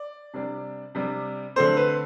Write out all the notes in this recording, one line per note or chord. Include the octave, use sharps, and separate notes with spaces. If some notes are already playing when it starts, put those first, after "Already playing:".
Already playing: D5
C3 G3 D4
C3 G3 D4
D3 A3 C4 C5
B4